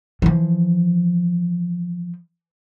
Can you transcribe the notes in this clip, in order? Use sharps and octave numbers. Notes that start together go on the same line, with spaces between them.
E3 F3